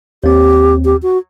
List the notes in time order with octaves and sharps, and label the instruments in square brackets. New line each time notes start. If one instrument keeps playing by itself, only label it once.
[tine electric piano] D#2 C4 [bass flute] G4
[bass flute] G4
F#4